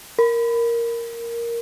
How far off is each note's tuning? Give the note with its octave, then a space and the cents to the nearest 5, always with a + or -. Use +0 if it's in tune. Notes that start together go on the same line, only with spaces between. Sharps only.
A#4 +0